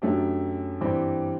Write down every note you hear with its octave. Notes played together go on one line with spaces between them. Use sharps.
F#2 F#3 A3 D4 G4
G2 E3 G3 C4 G4